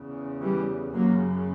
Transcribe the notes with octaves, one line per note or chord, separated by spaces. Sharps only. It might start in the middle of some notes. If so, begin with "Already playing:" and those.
Already playing: E2 C#3
E3 G3
F#2 C#3 F#3 A#3